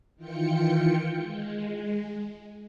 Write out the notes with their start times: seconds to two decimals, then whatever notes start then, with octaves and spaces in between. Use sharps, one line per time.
0.16 D#3 E3 F4 G5 C#7
1.15 G#3